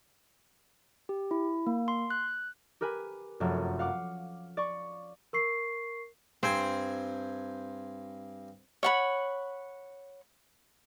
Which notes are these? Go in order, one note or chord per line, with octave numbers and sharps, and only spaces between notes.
G4
E4
A#3
C6
F#6
G4 A#4 B4 G#5
F1 F#2
F5 F#5 D6
D5 C#6
A#4 C#6 C7
G2 C4 C5 G#5
C#5 F#5 B5